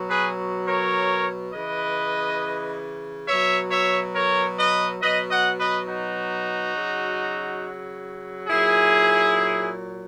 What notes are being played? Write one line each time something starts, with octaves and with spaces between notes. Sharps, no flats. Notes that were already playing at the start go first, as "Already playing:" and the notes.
Already playing: B2 F#3
G#4 B4
A#4 C#5
C#3 E3 B4 D#5
B2 F#3 C#5 E5
C#5 E5
A#4 C#5
B4 D#5
B2 F#3 B4 D#5
D#5 F#5
B4 D#5
D#4 F#4
C#3 F#3
A#2 F#3 E4 G#4